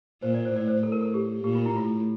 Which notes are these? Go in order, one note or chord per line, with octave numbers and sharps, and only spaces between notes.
A#2 C5
D5
C5
A2 D5
C5
A2 A4
A#4
A4
G4
A#2 G4
F4
E4
A2 F4